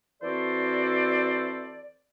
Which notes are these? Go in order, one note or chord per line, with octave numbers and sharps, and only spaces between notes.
E3 C4 F#4 A4 C5 D5